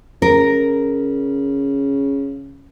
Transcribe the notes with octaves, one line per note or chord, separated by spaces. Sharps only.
C#3 A#4